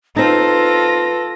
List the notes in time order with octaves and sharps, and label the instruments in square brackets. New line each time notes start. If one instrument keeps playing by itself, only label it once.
[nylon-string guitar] C4 D#4 [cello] F4 A4 [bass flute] B4 [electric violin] A#6